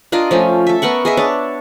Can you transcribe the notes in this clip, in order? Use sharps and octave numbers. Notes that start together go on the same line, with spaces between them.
D4 F4 A#4 D#5
F3 A3 C#4
A4 E5
B3 A#4 F#5 C#6
G#4 D#5 E5
D4 C#5 A5